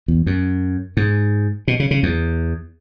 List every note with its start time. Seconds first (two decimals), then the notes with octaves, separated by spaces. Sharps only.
0.08 E2
0.26 F#2
0.97 G#2
1.68 B2
1.80 C#3
1.91 C#3
2.03 E2